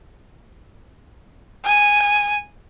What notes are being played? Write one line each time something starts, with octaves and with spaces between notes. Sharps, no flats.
G#5